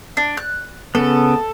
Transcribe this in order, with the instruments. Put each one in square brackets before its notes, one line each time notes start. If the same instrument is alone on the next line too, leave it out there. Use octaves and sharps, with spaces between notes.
[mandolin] D4
F#6
[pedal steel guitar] C#3 B3 [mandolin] A4